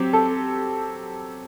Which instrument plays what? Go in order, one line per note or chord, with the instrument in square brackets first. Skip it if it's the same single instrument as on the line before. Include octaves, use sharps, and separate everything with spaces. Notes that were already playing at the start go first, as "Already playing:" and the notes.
Already playing: [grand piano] F#3 C4 [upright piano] G4
[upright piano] A4